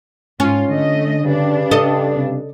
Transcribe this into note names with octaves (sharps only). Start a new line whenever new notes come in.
G#2 C#4 F4
D3 A3 D#5
G2 C#3 D4
A4 D#5
C3